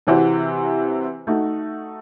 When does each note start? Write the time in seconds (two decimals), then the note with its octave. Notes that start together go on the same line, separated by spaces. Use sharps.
0.07 C3 E3 C4 F#4
1.27 A3 D#4 F#4